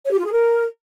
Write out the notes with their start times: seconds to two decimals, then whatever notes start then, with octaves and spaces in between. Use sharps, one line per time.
0.05 C#5
0.11 G4
0.18 F4
0.25 G#4
0.31 A#4